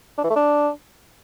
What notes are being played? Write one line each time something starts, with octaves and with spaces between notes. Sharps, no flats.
D4
E3
A3
D4